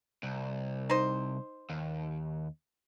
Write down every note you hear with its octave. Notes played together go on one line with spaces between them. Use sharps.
C2
D#4 C5
D#2